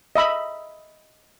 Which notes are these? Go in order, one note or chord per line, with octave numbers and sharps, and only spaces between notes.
D#5 E5 B5